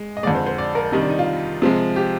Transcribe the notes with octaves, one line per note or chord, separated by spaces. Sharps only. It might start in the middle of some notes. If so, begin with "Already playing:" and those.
Already playing: G#3
D#5
F2 D3 G#3 D5
C5
C5
D5
A#4
C3 D#3 G3 D#4
D4
D#4
F4
C3 F3 G#3
G4